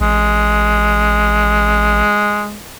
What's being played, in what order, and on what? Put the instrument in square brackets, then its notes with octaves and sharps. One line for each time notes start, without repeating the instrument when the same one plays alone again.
[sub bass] A1 [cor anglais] G#3